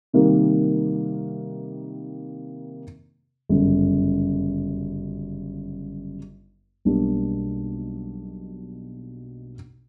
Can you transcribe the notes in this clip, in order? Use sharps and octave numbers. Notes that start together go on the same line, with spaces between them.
C3 D#3 G3 A#3
G1 F#2 C#3
B1 B2 G3 A#3 D4